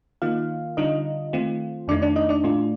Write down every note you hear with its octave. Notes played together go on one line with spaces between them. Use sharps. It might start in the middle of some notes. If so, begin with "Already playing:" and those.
D#3 A#3 D#4 F4 F5
D3 G3 D4 D#4 F4 D#5
D#3 A3 C4 F4
F2 D#3 A3 D4 D#4 D5
D4 D5
D#4 D#5
D4 D5
A2 A3 D4 F4